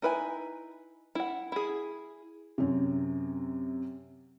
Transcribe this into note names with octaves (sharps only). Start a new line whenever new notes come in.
D#4 E4 B4 C#5 G#5
E4 F#5
E4 G#4
F#2 C3